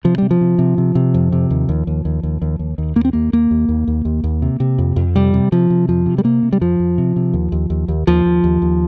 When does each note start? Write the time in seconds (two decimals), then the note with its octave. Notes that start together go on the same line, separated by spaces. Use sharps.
0.04 C3 F3
0.18 C3 G3
0.31 F3
0.41 C3
0.59 C3
0.78 C3
0.95 C3
1.14 F2
1.32 C3
1.50 D#2
1.69 D#2
1.87 D#2
2.05 D#2
2.23 D#2
2.42 D#2
2.59 D#2
2.78 D#2
2.96 D#2 A#3
3.05 C4
3.13 D#2 A#3
3.33 D#2 A#3
3.51 D#2
3.69 D#2
3.88 D#2
4.05 D#2
4.24 D#2
4.42 C3
4.60 C3
4.78 F2
4.96 F2
5.16 C3 G3
5.34 C3
5.52 C3 F3
5.70 C3
5.89 F2 F3
6.06 C3
6.18 G3
6.24 C3 A#3
6.43 C3
6.53 G3
6.61 F2 F3
6.80 F2
6.98 C3
7.16 C3
7.33 D#2
7.52 D#2
7.70 D#2
7.88 D#2
8.07 D#2 F3
8.25 D#2
8.44 D#2
8.62 D#2